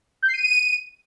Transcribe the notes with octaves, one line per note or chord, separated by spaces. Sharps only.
G6
C7
D#7